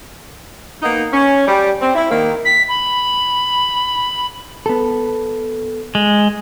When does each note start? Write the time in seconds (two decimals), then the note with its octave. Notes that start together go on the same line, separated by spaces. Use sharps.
0.83 A#3 B3 D#4
1.13 C#4
1.48 G3
1.82 C4
1.95 E4
2.11 D#3 A#3
2.45 B6
2.68 B5
4.66 B3 A4
5.95 G#3